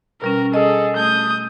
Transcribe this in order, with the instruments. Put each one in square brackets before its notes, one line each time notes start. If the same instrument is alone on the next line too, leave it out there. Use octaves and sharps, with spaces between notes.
[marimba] B2 G3 C#4 [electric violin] A#4
[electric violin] G#4 A4 [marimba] D#5
[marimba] A3 [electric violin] D#6 G6